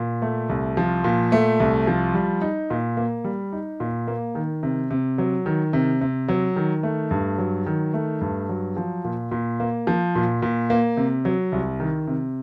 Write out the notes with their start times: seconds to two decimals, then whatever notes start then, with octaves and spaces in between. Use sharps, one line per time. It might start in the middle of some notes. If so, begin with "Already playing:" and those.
Already playing: A#2
0.22 A3
0.49 C2
0.77 F3
1.04 A#2
1.32 A3
1.60 C2
1.87 F3
2.14 G3
2.42 D#4
2.70 A#2
2.97 A#3
3.24 G3
3.53 D#4
3.80 A#2
4.08 A#3
4.35 D#3
4.63 C3
4.91 C3
5.18 F#3
5.46 D#3
5.73 C3
6.01 C3
6.28 F#3
6.56 D#3
6.83 A3
7.11 G2
7.38 F#3
7.66 D#3
7.94 A3
8.21 G2
8.49 F#3
8.77 F3
9.04 A#2
9.31 A#2
9.60 A#3
9.87 F3
10.15 A#2
10.42 A#2
10.70 A#3
10.97 C3
11.25 F#3
11.52 C2
11.80 D#3
12.07 C3